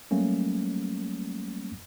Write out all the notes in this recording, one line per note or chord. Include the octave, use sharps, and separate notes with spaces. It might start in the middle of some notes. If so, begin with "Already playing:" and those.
F#3 G3 A3 A#3 C#4